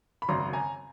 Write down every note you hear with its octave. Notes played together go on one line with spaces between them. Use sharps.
B5
G#1 F#2 C#3 A#5 C6
G#5 A#5